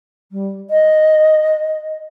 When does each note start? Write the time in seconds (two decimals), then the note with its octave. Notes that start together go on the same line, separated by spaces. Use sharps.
0.31 G3
0.70 D#5